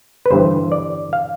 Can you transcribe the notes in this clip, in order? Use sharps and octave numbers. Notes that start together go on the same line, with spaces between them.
B4
G1 G2 E3 C5
D5
F5